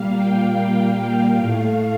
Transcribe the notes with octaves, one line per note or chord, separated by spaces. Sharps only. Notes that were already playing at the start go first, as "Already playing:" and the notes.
Already playing: A#2 G3 A#3 F5
G5
A2 A3 F5